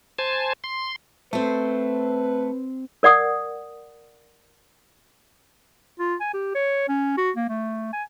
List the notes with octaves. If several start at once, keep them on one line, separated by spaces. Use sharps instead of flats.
C5 G#5 A5
C6
A3 C4 B4 C5
A#4 D5 F#5 D#6
F4
G#5
G4
C#5
C#4
F#4
A#3
A3
G#5